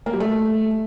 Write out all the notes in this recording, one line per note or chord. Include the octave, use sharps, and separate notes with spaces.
A#3
G3
A3